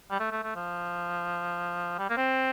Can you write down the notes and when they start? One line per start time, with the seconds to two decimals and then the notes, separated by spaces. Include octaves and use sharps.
0.11 G3
0.20 A3
0.31 A3
0.43 A3
0.56 F3
1.99 G3
2.10 A#3
2.17 C4